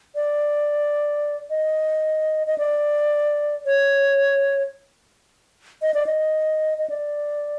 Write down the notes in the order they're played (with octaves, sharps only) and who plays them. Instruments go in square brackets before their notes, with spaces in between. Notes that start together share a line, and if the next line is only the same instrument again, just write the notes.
[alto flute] D5
D#5
D#5
D5
C#5
D#5
D5
D#5
D#5
D5